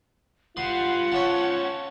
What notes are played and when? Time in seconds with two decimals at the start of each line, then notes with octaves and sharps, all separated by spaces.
0.57 G3 F4 B4 F#5 C6
1.12 C#4 C5 C#5 A5